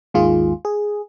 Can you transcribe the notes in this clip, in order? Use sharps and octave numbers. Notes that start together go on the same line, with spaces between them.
G#1 D#2 D#3 G#3 F4 G#4
G#4